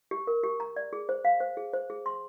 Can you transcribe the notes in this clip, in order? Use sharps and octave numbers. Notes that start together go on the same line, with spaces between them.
G4
A#4
G4
A#5
D5
G#4
C5
F5
C5
G#4
C5
G#4
C6